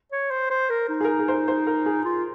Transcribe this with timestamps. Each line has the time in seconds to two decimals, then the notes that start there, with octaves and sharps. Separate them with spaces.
0.12 C#5
0.31 C5
0.50 C5
0.70 A#4
0.89 D#4
1.01 G#4
1.04 A#4
1.19 G#4
1.28 C5
1.34 A#4
1.48 C5
1.67 A#4
1.86 G#4
2.05 F4